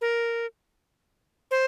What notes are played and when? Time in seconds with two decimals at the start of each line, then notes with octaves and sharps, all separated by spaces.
0.01 A#4
1.51 C5